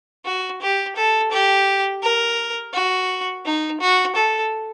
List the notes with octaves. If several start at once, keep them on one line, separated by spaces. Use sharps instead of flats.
F#4
G4
A4
G4
A#4
F#4
D#4
F#4
A4